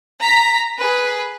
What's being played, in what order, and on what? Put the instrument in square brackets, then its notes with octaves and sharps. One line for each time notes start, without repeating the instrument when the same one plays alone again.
[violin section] A#5 B6
G#4 B4